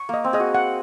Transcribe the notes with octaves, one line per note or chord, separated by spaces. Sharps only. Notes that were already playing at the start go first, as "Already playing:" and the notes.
Already playing: C#6
A#3 D#5
C4
G#4 D#5
F#4
F#5